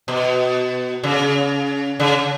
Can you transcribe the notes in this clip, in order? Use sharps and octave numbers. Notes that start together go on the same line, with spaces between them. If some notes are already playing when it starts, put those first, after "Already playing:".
B2
C#3
C#3